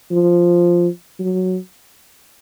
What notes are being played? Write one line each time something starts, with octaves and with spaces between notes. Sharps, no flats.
F3
F#3